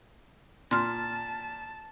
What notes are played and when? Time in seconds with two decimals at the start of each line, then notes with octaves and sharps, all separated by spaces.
0.71 A#2 A5 C6 F6